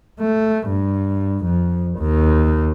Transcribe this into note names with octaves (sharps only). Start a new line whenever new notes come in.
A3
G2
F2
D#2